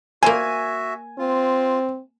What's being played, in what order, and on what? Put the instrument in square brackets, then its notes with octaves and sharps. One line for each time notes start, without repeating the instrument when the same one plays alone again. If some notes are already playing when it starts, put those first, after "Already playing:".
[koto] A#3 C5 [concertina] F#4 E5 [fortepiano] G#5
[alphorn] C4 [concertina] F4